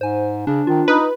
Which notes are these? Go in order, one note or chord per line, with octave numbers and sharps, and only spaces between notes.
G#2 C5 G#5
C#3 D4
D#3 F4
D#4 B4